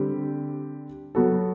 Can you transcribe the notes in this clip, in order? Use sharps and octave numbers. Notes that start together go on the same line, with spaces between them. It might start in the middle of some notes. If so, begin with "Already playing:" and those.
Already playing: D3 G3 C4 G4
F#3 B3 F#4 A4